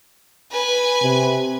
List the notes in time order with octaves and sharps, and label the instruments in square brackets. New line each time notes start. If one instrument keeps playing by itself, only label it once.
[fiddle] B4 G#5
[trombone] C3